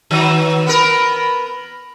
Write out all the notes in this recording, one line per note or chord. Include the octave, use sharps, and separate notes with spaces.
D#3 F#3
B3 A#4